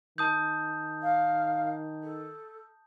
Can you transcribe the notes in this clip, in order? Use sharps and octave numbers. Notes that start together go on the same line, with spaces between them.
D#3 A5 D#6 G6
F5
A4